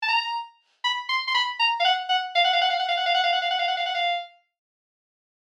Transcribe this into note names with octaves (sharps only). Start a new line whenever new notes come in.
A5
A#5
B5
C6
C6
B5
A#5
F5
F#5
F#5
F5
F#5
F5
F#5
F5
F#5
F5
F#5
F5
F#5
F5
F#5
F5
F#5
F5
F#5
F5
F#5
F5